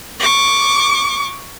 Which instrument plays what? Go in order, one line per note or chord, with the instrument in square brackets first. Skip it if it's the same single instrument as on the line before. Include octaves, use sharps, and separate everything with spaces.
[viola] C#6 D6